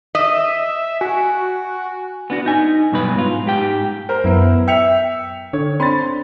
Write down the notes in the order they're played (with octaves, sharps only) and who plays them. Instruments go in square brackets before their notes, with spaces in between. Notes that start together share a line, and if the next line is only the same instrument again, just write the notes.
[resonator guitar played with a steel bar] D#5 [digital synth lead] E5
[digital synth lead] F#4 [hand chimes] G#5
[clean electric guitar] B3 D4 F#4
D#4 G#5
G2 B2 F#3 B4
G#2 F4
G#2 G4 G5
[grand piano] A#4 C5
[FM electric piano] F#2 B3 [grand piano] E4
[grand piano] E5 C#7 F7 [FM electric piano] G5
[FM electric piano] D3 [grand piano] C#5
[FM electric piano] C4 D4 B5 [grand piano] C6 A6